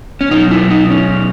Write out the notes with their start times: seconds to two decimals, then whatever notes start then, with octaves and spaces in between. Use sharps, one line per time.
0.21 C#4
0.31 B2 F#3 D#4
0.51 E4
0.70 D#4
0.90 C#4